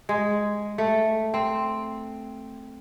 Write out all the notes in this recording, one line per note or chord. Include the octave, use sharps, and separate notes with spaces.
G#3
A3
C4